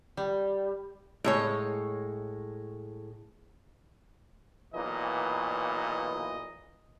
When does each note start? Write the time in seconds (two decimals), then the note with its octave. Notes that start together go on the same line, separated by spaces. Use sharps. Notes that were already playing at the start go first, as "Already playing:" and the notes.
0.17 G3
1.24 A2 G#3 C#5
4.74 B1 A#2 E3 D#5